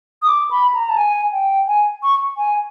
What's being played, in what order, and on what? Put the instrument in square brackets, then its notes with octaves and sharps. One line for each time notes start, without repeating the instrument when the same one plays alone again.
[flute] D#6
D6
B5
A#5
A5
G#5
G5
G#5
C#6
G#5